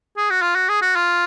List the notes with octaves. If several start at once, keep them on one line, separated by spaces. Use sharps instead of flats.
G#4
F#4
F4
F#4
G#4
F#4
F4